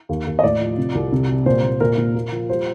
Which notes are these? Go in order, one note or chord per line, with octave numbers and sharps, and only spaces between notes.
D#2
D#2
D#5
A2 D5
F3
C3
C2
C3
G3
A#2 C5
A#2
A#2 A#4
A#2
A#3
F3
G3 C5